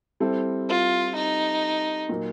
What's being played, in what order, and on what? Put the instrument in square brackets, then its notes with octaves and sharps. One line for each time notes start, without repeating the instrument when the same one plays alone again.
[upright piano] G3 C4 E4 A4
[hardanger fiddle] F4
D#4
[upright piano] A#2 F#3 A#3